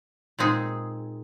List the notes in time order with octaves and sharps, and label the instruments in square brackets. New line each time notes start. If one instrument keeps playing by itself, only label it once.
[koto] A#2 G#3 C4 D#4 G#4